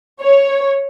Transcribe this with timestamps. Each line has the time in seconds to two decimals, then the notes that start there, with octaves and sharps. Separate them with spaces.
0.22 C#5